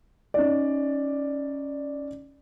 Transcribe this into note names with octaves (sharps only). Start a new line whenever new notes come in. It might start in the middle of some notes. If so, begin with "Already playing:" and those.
C#4 D#4 D5